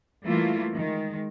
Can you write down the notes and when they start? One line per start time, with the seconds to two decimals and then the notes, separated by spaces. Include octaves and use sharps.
0.25 E3 G3 A3 A#3 E4 F4
0.75 D#3 G#3